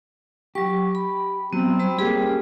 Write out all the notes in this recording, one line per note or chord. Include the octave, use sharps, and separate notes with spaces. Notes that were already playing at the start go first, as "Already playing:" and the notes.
F#3 G4 C#6
B5
F#3 B3 C4
G3 C5 B5
A#3 G4 G#4
C#4